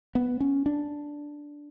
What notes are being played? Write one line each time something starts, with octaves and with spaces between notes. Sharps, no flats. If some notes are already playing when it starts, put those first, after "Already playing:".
B3
C#4
D4